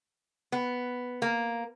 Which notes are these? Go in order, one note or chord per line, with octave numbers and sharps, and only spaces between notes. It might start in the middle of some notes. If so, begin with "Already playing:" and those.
B3
A#3